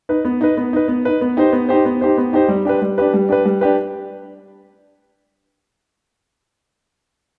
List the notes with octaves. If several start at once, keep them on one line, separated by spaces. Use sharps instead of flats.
D#4 B4
B3
D#4 B4
B3
D#4 B4
B3
D#4 B4
B3
D#4 G4 C5
B3
D#4 G4 C5
B3
D#4 G4 C5
B3
D#4 G4 C5
G3
D4 G4 B4
G3
D4 G4 B4
G3
D4 G4 B4
G3
D4 G4 B4